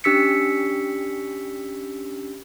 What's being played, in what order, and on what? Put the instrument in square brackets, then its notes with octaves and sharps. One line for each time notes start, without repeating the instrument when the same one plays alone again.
[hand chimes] C#4 D4 G4 E6 B6 C#7